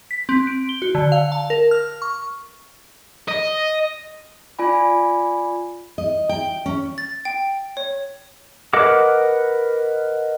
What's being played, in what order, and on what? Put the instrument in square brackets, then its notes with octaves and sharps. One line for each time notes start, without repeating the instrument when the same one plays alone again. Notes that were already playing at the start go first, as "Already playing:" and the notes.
[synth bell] B6
C4
D7
G7
F#4
D3
F5
A5
A#4
F6
C#6
[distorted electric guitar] D#5
[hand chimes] F4 D5 G#5 B5
[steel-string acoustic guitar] D#5
G5
C#4
[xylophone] A6
G5
C#5
[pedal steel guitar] A#4 B4 D#5 F#5 D6